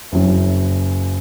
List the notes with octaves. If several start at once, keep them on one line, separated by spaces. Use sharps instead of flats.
F#1 F#2 C#3 F#3